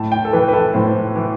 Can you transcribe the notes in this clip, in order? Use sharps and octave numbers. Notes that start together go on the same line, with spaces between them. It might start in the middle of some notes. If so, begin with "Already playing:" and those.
Already playing: A2 A5
G5
A4
E3 B4
B4
A4
A2 C5
E3